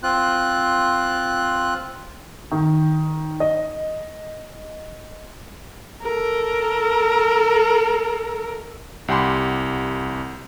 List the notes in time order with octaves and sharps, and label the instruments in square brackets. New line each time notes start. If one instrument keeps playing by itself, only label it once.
[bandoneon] C4 F4 F#6
[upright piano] D#3
D#5
[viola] A4 A#4
[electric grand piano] C2 G4 F#5 G#5 B5 C6